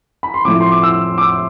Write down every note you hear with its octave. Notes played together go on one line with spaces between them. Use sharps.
B5
C6
A2 F3 C4 D6
C6
D6
E6
D6
E6